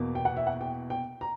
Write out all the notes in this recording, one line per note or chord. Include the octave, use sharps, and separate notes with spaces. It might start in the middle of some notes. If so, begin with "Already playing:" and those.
Already playing: E2 B2 A#3
G5
F#5
E5
F#5
G5
G5
A#5